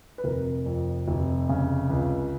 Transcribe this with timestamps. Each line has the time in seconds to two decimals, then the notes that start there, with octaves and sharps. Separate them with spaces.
0.18 B4
0.24 F1 A#4
0.66 F2
1.08 F1
1.49 C#3
1.90 C#2